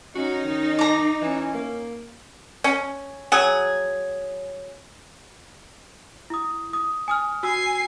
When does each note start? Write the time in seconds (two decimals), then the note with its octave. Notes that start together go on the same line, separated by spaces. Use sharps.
0.15 C#4 D#4 F#4
0.45 D#3
0.79 A#5 D6
1.22 E3 C#4
1.54 A#3
2.64 C#4
3.32 F#3 G#4
6.30 E4 D#6
6.73 D#6
7.08 G#5 D#6 F6
7.43 F#4 G#5 E6 C7